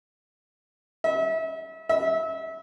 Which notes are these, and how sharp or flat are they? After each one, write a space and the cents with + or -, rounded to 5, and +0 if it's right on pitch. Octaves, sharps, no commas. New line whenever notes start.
E5 -35
E5 -25